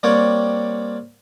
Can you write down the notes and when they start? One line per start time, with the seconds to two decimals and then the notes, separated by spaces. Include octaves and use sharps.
0.03 G3 A#3 C4 C#5 D5 F#5